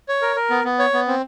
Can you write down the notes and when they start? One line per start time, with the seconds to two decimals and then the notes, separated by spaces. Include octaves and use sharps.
0.09 C#5
0.22 A#4
0.36 A#4
0.50 B3
0.64 B3
0.79 C#5
0.94 B3
1.08 C4